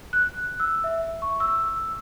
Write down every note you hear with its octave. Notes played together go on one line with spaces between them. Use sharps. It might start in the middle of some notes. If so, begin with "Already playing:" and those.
F#6
E6
E5
C#6
E6